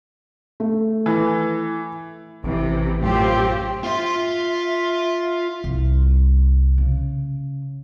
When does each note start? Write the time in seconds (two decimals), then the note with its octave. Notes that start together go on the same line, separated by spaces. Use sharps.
0.60 A3
1.06 E3
2.44 A1 C3 E3
3.01 F#2 A2 C4 F4 G4
3.84 F4 E5 C6
5.64 C2
6.78 C#3